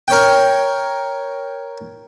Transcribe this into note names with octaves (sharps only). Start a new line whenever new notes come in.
A#4 C#5 G5